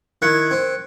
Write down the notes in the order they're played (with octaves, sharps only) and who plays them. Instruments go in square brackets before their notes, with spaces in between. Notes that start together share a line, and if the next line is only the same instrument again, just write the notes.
[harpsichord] D#3 E4 [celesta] F#6 G#6 C#7
[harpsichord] C4